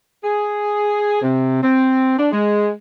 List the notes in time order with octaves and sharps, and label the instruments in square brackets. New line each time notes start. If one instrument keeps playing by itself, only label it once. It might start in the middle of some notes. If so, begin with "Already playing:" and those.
[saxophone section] G#4
C3
C4
D4
G#3